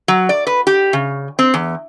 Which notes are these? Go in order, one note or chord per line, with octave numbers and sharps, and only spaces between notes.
F#3
D5
B4
G4
C#3
C4
E2